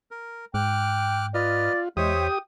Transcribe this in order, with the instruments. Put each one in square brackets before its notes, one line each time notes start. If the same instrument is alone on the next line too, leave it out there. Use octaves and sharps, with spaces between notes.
[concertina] A#4
[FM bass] G#2 [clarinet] G5 [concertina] D6 F6 F#6
[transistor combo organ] F4 [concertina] B4 D#5 F6 [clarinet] D5
[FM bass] E2 [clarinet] G#3 [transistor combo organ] G4 D#6 [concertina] C5 C#5 E5
[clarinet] G5